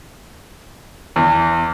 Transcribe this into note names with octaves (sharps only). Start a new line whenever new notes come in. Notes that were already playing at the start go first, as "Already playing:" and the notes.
E2